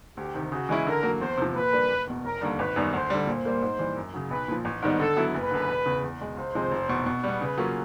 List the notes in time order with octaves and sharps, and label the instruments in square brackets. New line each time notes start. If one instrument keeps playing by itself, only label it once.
[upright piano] D2 [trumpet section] G4
[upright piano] C3 D#3
[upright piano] C#3 [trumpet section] F#4
[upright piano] E3 G#3 C#4 E4
[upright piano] D3 [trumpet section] A#4
[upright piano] F#3 A#3
[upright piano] E2 [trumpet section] C5
[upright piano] C3 F3
[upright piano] A#2 [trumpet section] B4
[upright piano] G3 A#3 D4
F#1
E2 B2
[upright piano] F1 [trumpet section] A#4
[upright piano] D#2 D3 G3
[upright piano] G#1 [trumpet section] B4
[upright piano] F#2 D#3 G3 B3
[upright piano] D2 [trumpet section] C5
[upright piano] D3 G3
[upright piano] A#2 [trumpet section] C5
[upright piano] G3 A#3
G#2
E3 G3
F#2
C#3 F#3
[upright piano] B1 [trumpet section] B4
[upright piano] A#2 F3
A1
G#2 D#3 G3 B3
[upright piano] D3 [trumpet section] A4
[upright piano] F#3 B3 E4
[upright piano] F#1 [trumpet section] B4
[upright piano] F#2 D3
E1
E2 C#3
E2
B2 G#3
[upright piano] C#2 [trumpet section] C5
[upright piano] C3 F3 G#3 C4
F1
E2 B2
B2
G3 B3
[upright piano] C#3 [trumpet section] B4
[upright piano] F#3 A#3 C#4 F4